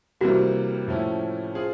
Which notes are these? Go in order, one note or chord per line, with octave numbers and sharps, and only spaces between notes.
C3 E3 G3 A#3 F#4
A2 F3 A3 C#4 E4
C4 F4 G#4